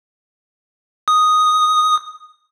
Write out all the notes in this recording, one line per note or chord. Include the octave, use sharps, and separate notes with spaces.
D#6